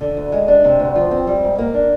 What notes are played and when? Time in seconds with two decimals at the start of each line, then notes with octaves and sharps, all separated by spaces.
0.01 D3
0.17 D2
0.32 G#3
0.48 D4
0.64 C3
0.79 D2
0.95 F3
1.11 C4
1.27 G3
1.43 G#2
1.58 A#3
1.74 D4